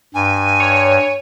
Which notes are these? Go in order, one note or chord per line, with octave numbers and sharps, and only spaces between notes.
G2 G#5
C#5